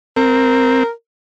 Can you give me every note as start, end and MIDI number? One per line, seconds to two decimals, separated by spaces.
0.16 0.83 60
0.16 0.90 70